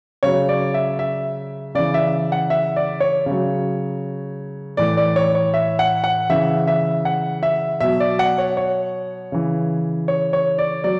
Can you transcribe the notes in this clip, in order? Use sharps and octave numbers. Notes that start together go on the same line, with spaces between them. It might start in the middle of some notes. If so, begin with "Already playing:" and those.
C#3 F#3 C#5
D5
E5
E5
C#3 E3 D5
E5
F#5
E5
D5
C#5
C#3 F#3
A2 E3 D5
D5
C#5
C#5
E5
F#5
F#5
C#3 E3 E5
E5
F#5
E5
B2 F#3 E5
D5
F#5
C#5
C#5
C#3 E3
C#5
C#5
D5
F#3 D5